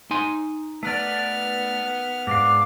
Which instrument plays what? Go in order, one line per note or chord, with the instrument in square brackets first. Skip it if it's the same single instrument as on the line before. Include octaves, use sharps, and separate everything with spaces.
[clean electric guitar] D#4 G#5 C6
[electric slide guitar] A3 B4 D5 [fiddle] B3 F6
[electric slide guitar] G#2 D4 F5 [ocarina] D6